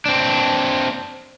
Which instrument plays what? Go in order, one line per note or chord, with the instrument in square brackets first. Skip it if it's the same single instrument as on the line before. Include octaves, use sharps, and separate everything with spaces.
[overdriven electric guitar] C4 D4